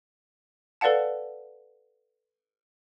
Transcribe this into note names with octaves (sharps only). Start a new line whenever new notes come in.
A4 B4 D5 F5 F#5 A5